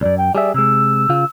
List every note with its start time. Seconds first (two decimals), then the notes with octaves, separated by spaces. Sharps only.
0.01 C2 F#2 D5
0.18 G5
0.35 G3 G#4 D5 E5
0.54 C3 G#3 E6
1.09 C#3 F4